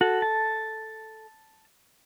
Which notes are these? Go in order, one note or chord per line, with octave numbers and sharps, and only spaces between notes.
F#4 A4
A5